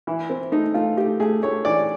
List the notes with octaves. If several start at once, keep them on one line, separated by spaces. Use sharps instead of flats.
E3 E4
C4
A3 D#4
A3 F4
A3 G4
A3 G#4
A3 C#5
E3 D5